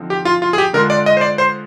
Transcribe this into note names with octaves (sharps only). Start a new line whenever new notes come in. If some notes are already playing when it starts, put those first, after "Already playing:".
Already playing: D3 F3 C4 D#4
G4
F4
F4
G#4
G4
D3 G#3 D4 F4 A#4
D5
D#5
C5
D5
C5